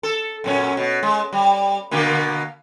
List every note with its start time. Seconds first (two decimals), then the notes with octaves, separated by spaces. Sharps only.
0.03 A4
0.44 F#2 A#2 C#4
0.77 B2
1.03 G#3
1.32 G3
1.91 B2 D3 A#3